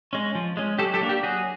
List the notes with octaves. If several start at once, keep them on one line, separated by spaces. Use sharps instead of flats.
G#3 C#4
F3
G#3 C#4
F#3 G4 A4
G4 A4
A#3 D4
G4
F#3 F#4 G#4